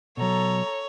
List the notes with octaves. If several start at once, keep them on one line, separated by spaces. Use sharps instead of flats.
B2 F#3 A4 C#5 A#5